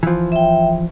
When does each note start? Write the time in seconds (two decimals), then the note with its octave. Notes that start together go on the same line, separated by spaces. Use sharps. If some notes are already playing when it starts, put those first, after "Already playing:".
0.03 E3 F3
0.32 E5 G5